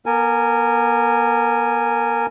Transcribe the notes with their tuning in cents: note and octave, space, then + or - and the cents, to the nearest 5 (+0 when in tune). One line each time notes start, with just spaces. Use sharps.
B3 -45 A#4 -20 G#5 +0